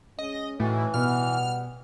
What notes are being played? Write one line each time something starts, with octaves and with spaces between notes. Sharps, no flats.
G#3 C#4 D#5
A2 E3 C#4 D#4 F#4
B2 G3 B3 F#5 F6